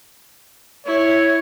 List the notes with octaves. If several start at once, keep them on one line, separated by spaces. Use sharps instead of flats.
E4 C#5